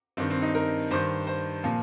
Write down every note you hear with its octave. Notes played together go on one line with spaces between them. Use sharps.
G2 D#3 C4
C4
D#4
A#4
G2 D#3 C5
C5
A#2 F3